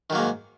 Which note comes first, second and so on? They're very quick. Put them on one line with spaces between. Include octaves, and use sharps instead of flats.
D#3 F#3 A#3 G#2